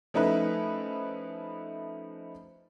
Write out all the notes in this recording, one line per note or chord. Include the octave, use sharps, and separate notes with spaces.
F3 A3 C#4 D#4 E4 B4